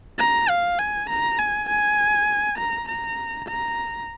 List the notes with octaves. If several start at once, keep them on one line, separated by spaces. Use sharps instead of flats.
A#5
F5
G#5
A#5
G#5
G#5
A#5
A#5
A#5